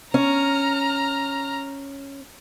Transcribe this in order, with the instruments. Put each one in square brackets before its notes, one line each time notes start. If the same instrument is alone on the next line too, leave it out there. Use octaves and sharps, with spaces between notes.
[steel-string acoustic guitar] C#4 [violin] A#5 F6